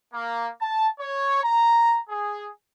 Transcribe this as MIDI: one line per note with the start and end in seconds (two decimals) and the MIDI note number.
0.13 0.49 58
0.60 0.87 81
1.00 1.42 73
1.43 1.98 82
2.08 2.49 68